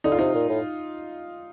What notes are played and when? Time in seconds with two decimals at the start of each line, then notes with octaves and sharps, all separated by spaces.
0.04 D3 D#4
0.12 F4
0.19 C3 D#4
0.34 A#2
0.49 A2